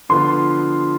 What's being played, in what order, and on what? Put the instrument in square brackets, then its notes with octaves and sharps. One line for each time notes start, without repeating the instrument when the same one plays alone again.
[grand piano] D3 F3 B3 F4 [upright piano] C6